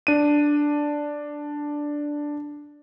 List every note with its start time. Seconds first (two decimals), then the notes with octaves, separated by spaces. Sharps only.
0.07 D4 D#7